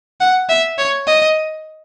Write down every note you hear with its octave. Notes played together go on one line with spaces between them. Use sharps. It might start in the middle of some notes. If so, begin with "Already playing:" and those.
F#5
E5
C#5
D#5